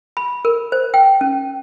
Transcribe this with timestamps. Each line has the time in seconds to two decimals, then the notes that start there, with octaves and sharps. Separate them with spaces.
0.17 B5
0.45 A#4
0.72 C5
0.94 G5
1.21 C#4